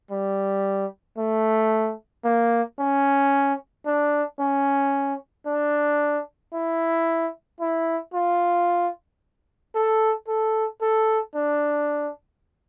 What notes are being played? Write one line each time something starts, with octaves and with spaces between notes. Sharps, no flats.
G3
A3
A#3
C#4
D4
C#4
D4
E4
E4
F4
A4
A4
A4
D4